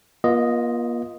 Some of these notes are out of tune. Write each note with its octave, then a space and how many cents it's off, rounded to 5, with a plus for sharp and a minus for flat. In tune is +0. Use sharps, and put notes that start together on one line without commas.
A#3 +45 F4 +0 D#5 +0